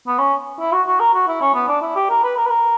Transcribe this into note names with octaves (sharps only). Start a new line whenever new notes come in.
B3
C#4
E4
F#4
F#4
A#4
F#4
E4
C#4
B3
D4
E4
G4
A#4
B4
A#4
B4
A#4